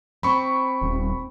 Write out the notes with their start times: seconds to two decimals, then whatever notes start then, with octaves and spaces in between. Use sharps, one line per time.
0.23 C4 B5 C#6
0.81 D#1